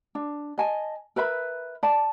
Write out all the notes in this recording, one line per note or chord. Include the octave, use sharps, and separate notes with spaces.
D4
D#5 G#5 A5
A#4 B4 E5 B5
D5 A5